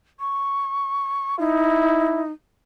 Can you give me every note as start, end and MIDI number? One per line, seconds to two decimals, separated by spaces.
0.20 1.37 85
1.39 2.32 63
1.39 2.22 64